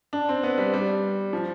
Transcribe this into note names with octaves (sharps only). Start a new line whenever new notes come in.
D4
C4
B3
G3
G3
F3